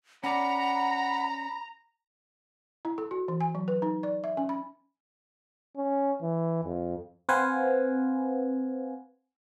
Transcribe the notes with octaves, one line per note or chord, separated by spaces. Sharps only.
C#4 D5 F#5 A#5 B5
E4
A4
F#4
E3
G#5
F#3
B4
D#4
D5
E5
C#4
B5
C#4
E3
F2
C4 B4 C5 F5 F#5 G#5